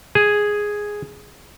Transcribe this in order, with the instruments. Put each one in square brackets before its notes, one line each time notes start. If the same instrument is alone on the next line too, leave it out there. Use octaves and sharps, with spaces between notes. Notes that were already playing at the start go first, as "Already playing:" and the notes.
[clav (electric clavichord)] G#4